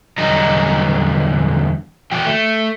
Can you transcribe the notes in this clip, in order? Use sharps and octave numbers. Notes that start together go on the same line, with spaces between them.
E2 D3 F#3 G3 D#5 A#5
E3 F#4 G5
A3